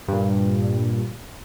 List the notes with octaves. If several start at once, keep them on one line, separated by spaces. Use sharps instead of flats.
G2 A#2